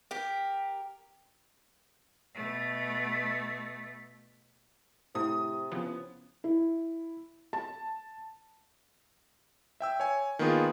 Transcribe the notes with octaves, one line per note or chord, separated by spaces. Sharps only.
G4 A#4
B2 A3
A2 C3 E4 D#6
C#3 F3 B3
E4
A5
E5 G5 E6
C#5 G#5
D#3 A#3 B3 F4 G#4